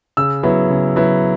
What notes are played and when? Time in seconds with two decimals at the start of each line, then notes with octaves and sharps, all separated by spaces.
0.17 C#3 E6
0.43 F#3 B3 E4
0.70 C#3
0.96 F#3 B3 E4